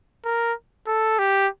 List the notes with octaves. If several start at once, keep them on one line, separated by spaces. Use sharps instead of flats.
A#4
A4
G4